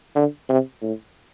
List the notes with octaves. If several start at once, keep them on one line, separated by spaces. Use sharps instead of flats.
D3
C3
A2